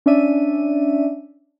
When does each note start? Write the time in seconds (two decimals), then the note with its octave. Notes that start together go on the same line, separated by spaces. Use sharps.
0.06 C#4 D4 D5 E5 D#7